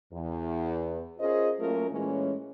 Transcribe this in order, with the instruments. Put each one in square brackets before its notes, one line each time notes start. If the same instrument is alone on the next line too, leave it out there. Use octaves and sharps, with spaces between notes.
[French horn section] E2
C#4 F4 G#4 A#4 C5 D#5
F#3 A3 A#3 C#4 F4 A#4
A#2 E3 G#3 A3 C#4